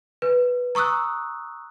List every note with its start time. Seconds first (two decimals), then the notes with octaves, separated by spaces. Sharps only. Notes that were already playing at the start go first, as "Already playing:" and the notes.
0.22 B4
0.75 A#5 C#6 D#6 E6 F#6